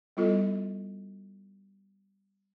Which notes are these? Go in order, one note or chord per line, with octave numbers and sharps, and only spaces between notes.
G3 B3 E4 F4 A4 D#5